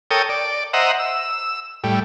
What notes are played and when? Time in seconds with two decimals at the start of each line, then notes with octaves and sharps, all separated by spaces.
0.11 A4 A#4 C#5 G5 D#6
0.29 D5
0.73 C5 D#5 E5 F#5 A#5
1.00 E6
1.84 A2 G3